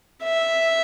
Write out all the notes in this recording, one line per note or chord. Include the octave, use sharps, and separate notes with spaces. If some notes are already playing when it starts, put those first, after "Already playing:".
E5